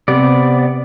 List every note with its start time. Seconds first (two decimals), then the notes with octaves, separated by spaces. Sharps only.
0.08 C3 B3 D5